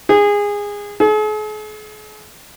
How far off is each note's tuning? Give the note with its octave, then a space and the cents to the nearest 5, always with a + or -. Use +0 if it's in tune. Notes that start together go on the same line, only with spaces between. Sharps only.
G#4 -20
G#4 +45